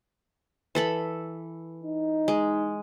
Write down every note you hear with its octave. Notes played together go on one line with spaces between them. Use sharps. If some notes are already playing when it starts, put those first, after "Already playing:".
E3 A4 B5
D#4
G#3